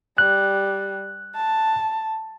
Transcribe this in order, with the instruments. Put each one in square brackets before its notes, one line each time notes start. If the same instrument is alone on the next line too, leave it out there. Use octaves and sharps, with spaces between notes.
[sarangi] G3 [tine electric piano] F#6
[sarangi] A5